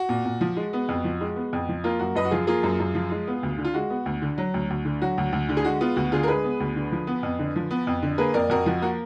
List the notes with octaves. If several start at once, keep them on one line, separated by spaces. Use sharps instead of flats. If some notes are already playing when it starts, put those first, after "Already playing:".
Already playing: F#4
A#2
A#2
F3
G#3
B3
F2
F3
G#3
B3
F2
F3
A#3 F4
F#2 F#4
F#2 B4 D#5
F#4
F3 F4 G#4
A#3 F4 G#4
F#2
F#2
F3
G#3
B3
D2
D3
F4
G#3 F#4
B3
D2
D3
F#3
D2
D2
D3
F#3 F#4
D2
D2
D3
G#4
G#3 F#4
B3 F4
D2 F#4
D3 F4 G#4
A#4
G#3 G#4 B4
B3
D2
D3
F3
B3
F2
D3
F3
B3
F2
D3
A#3 G#4 B4
F2 A#4 D5
F2 F#4 A#4
F3 F#4
A#3 F#4